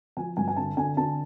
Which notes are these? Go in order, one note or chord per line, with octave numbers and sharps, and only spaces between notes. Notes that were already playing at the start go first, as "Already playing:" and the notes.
F3 G#5
G2 G#5
G#5
D3 A5
D3 G#5
D3 A5